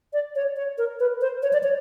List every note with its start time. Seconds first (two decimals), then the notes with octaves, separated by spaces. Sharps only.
0.13 D5
0.35 C#5
0.56 C#5
0.78 A#4
1.00 B4
1.21 C5
1.43 C#5
1.53 D5
1.63 C#5